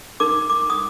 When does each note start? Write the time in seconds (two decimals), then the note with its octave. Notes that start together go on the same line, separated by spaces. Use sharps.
0.20 D#4 A#4 D6
0.50 D6
0.70 D#6